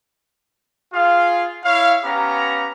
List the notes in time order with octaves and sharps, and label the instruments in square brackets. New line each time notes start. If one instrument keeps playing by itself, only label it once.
[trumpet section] F4 G#4 F5
E4 C#5 F5
B3 C#4 G4 F5 A#5